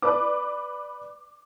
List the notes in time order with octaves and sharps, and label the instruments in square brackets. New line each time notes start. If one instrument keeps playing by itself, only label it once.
[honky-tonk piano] B4 D5 D6